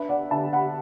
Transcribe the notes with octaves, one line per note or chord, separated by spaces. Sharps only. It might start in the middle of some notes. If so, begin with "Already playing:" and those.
Already playing: D4 B4 E5
D5 F#5
D3 E5 A5
F#5 B5